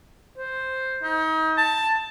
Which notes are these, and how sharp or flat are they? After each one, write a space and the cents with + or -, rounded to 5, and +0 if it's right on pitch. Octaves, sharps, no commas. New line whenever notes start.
C5 +0
D#4 +35
A5 +10